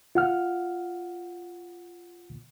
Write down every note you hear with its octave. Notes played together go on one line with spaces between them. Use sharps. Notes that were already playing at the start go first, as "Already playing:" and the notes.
F4 F#5 F6